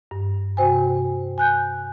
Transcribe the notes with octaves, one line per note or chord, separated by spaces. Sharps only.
G2
C3 F#4 C5 G5 G#5
G#5 F#6 G6